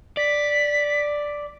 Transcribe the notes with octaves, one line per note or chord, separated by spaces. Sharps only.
D5 B6